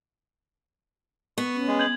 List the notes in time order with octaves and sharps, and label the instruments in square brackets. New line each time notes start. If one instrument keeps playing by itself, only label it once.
[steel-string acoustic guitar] B3 [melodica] C#6
[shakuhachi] C#4
[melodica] G#3
[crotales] G6 G#6 F#7